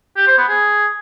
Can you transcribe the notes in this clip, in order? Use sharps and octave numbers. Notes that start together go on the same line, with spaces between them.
G4
C5
B3
G#4